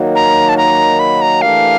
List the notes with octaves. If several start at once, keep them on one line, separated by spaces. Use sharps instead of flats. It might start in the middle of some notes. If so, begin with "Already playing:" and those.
Already playing: D#3 F#3 A#3 D#4 F#4
A#5
A5
A#5
B5
A#5
E3 A3 D4 G4 A#4 F5